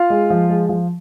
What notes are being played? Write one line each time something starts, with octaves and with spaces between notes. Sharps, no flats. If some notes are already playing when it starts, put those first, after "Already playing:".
Already playing: F4 F5
G#3
F3
G#3
F3